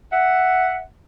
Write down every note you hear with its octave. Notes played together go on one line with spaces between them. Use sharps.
E5 F#5